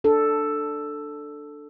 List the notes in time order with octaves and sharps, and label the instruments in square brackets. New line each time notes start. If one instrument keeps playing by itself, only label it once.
[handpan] D4 A4